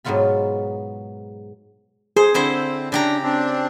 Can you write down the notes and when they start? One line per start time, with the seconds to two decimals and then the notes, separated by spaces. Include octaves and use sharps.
0.05 G#2 B2 F#3 B3 F4 B5
2.16 G#4 C5
2.34 D3 C4 E4 C5
2.92 C#3 D4 G4 A#5
3.23 C4 D4